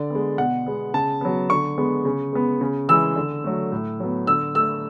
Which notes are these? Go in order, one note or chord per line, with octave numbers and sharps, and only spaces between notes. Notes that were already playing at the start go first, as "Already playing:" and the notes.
Already playing: D3 D5
G#3 B3
B2 F#5
G#3 B3
C#3 A5
F#3 B3
D3 C#6
G#3 B3
C#3
G#3 B3
C#3
E3 G#3 E6
D3
F#3 A3
A2
F#3 B3
D3 E6
A3 E6